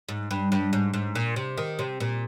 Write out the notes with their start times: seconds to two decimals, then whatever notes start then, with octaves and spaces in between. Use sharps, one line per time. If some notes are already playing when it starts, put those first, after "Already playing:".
0.09 G#2
0.31 G2
0.52 G2
0.73 G#2
0.93 G#2
1.15 A#2
1.36 C3
1.58 D#3
1.79 C3
2.00 A#2